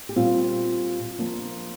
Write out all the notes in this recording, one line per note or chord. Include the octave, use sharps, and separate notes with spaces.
G4
A#2 G3 C4 F4
F3 A#3 D4